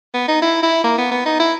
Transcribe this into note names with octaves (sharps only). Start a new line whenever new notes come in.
B3
D#4
E4
E4
A#3
B3
B3
D#4
E4